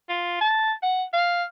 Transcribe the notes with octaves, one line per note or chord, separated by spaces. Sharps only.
F4
A5
F#5
F5